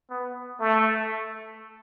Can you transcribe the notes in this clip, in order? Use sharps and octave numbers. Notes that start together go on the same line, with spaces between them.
B3
A3